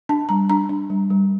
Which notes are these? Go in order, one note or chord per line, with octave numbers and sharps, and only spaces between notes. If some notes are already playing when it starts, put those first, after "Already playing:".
D4 A5
G3 A#5
D4 A#5
D4
G3
G3